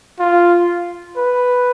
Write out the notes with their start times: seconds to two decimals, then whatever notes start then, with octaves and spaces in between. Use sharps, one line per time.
0.20 F4
1.17 B4